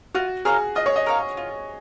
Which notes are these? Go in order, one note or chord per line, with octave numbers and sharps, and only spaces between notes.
F4 F#4
G#4 A#4 C#5 F5
F4 D#5
C#5
D#5
A#4 C#5 F5
F4